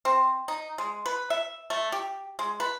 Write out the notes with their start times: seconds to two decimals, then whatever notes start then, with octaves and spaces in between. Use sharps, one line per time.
0.05 C4
0.48 D#4
0.78 G#3
1.06 B4
1.30 E5
1.70 A3
1.92 G4
2.39 G#3
2.60 B4